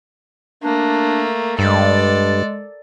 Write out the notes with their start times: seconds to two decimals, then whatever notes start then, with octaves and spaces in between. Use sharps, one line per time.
0.63 A3 A#3 D4
1.59 G2 G#3 A4 D5